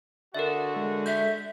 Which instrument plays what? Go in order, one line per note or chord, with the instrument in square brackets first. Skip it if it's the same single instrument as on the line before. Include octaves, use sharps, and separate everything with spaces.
[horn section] D3 F#4 [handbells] A#4 E5
[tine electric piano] G#3 A4
[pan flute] E5 [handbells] G6